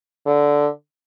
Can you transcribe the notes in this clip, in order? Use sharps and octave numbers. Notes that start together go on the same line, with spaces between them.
D3